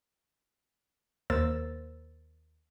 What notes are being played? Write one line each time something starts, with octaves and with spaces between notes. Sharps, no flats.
D#2 A#3 A#4 C5 E6 A6